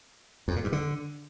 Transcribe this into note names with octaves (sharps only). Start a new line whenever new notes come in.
F2
A#2
G2
D3